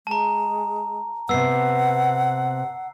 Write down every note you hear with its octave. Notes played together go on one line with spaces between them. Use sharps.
G#3 A5 A#5
C3 B3 F#5 E6 C7